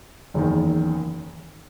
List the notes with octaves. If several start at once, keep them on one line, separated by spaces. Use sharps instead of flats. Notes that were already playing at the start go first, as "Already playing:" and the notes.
F#1 E2 D#3